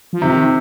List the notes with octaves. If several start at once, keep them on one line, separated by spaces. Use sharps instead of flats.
F3
C3 D#3